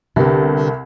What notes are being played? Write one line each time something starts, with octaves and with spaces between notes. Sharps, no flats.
C2 D3 B3 G4 A4 A#4